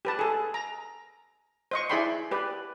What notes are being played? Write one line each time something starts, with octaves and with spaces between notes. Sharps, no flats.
G4 B4 A5
G#4 A4
A#5
C5 D#5 C#6
E4 G#4 D5 G5 B5 C6
G4 B4 D5